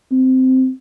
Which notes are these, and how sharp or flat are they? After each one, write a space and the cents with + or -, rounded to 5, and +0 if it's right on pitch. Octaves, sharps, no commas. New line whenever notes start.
C4 -10